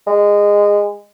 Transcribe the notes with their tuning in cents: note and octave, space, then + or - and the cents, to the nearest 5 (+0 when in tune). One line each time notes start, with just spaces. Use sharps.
G#3 -20